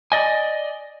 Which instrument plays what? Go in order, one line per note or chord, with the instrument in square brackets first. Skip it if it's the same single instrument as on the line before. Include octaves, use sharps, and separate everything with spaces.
[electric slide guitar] D5 D#5 G#5